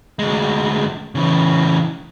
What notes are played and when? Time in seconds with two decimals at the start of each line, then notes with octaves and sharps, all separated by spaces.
0.19 D2 G#3
1.15 C#3 E3